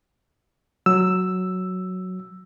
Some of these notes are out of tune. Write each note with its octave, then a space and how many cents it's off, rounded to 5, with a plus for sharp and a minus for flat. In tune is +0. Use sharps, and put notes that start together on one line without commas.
F#3 +0 E6 +0